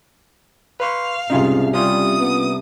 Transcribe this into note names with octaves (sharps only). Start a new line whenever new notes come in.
B4 F5 C6 C#6
C2 G#2 C#3 D#4 F4 G#4
G3 C#4 F4 D#6
B3